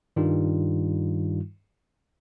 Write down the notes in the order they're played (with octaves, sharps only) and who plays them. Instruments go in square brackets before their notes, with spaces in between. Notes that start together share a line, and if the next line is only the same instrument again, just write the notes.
[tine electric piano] G2 D#3 G3 D#4 F4